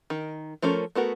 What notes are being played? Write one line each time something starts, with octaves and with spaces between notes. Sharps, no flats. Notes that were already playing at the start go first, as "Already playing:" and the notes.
D#3
F3 A3 C#4 A#4
A3 B3 F#4 A#4